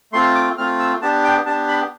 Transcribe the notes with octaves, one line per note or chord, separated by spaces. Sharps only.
A3 C4 F4 C6
D6
A3 C4 F4 F6
E6
B3 D4 G4 A5
G5
B3 D4 G4 A5
B5